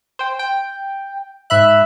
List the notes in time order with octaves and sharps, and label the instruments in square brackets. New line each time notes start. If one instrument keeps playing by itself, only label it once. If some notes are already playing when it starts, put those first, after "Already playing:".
[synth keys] C5 G5
G5
[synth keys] G#2 B5 F#6 [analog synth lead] E5